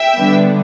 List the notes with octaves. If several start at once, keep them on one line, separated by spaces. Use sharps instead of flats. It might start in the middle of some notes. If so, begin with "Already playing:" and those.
Already playing: E5 G5
D3 G3 B3 D4